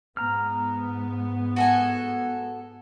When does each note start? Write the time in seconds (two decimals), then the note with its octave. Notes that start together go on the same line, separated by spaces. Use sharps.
0.17 G#2 B3 A#5 F6
1.56 F#4 A4 G#5